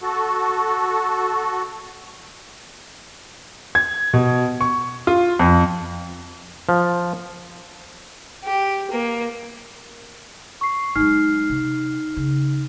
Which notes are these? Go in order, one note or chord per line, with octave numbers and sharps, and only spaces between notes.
F#4 A4
G#6
B2
C#6
F4
F2
F3
G4
A#3
C#6 C7
F#3 G#3 D#4 F6 C7
C3
C#3